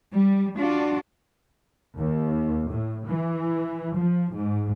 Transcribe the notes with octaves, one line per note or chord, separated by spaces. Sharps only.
G3
D4 F4 F#4 D5
D#2
A2
E3
F3
G#2